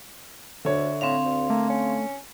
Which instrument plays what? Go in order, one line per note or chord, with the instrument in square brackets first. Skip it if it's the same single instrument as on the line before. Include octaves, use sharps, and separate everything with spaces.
[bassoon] D2 [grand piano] D3 C#5 [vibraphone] E5
[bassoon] A2 [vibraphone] C4 F5
[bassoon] D2
[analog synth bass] A3 [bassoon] A#3
[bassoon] C#4